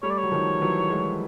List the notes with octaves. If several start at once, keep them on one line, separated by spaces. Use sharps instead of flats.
G3 A3 C#5
D5
C#5
F#3
D#3 F3
E3 F#3
F#3 G#3